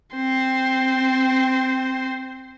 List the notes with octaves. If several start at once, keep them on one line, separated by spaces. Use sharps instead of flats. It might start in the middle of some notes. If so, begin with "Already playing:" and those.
C4 C5